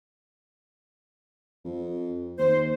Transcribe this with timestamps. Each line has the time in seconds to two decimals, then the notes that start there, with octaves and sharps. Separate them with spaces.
1.65 F2
2.38 D#2 C5